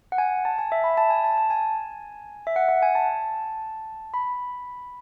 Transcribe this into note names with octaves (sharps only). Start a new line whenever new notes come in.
F#5
G#5
A5
G#5
E5
B5
A5
G#5
A5
A5
G#5
E5
F#5
F#5
G#5
A5
B5